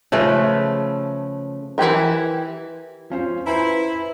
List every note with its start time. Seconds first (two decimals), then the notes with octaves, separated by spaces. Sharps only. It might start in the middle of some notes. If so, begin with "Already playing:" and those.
0.12 C#3 F3 A3 B4
1.78 E3 F#3 E4 G4 A#4
3.10 F3 C#4 C5
3.47 E4 B4 C5 G#5 A#5